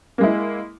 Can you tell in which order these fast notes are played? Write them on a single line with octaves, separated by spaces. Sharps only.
A#3 G#3 E4